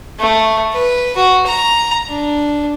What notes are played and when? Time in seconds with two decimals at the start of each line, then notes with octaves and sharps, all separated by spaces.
0.19 A3
0.74 B4
1.16 F#4
1.46 A#5
2.08 D4